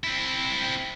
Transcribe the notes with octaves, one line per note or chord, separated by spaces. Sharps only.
C4 E4